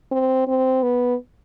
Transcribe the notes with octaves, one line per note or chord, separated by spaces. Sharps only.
C4
C4
B3